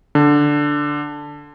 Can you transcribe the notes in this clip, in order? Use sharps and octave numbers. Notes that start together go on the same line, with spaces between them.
D3